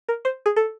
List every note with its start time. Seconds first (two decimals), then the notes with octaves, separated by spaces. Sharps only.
0.08 A#4
0.25 C5
0.46 G#4
0.56 A4